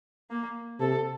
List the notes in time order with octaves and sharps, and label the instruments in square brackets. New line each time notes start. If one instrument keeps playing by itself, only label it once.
[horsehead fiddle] A#3
[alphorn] C3 [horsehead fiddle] A4